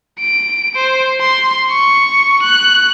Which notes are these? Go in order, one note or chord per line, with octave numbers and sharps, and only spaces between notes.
D7
C5
C6
C#6
F#6